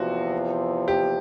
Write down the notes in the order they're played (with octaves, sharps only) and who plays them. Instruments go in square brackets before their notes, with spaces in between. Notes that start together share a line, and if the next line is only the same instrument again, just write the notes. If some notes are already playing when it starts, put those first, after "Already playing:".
Already playing: [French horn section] E2 C3 F3 [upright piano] F#4
[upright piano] G4